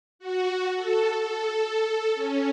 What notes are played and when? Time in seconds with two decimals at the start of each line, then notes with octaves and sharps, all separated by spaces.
0.19 F#4
0.76 A4
1.20 A4
2.15 C#4